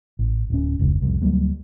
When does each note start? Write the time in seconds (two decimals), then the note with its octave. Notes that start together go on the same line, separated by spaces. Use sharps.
0.19 A1
0.50 D1 C#4
0.79 F1 C#2
1.02 C2 F2
1.21 D2 F#3 G3 A#3